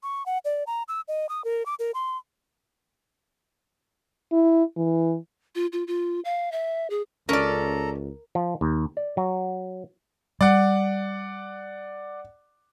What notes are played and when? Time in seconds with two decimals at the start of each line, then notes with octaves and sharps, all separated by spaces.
0.03 C#6
0.26 F#5
0.45 D5
0.67 A#5
0.88 E6
1.08 D#5
1.29 D#6
1.44 A#4
1.66 D6
1.79 A#4
1.94 C6
4.32 E4
4.77 E3
5.55 F4
5.73 F4
5.87 F4
6.25 F5
6.52 E5
6.90 G#4
7.29 C#2 C#4 A4 A#4 D5 A#5
8.35 F3
8.61 D#2
8.97 D5
9.17 F#3
10.41 G3 D5 F#5